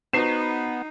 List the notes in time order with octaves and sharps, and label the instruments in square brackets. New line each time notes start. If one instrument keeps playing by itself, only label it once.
[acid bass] B3 [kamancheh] D#4 [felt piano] F#4 B4 C5 [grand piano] C7 E7